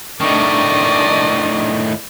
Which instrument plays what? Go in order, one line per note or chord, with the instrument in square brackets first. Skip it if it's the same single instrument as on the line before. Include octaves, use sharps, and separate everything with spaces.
[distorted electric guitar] A2 D#3 [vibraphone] A3 D4 A5 [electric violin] D5 D#5 [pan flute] C#6